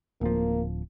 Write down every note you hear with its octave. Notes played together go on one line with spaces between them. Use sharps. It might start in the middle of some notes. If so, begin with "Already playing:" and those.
D1 F3 A#3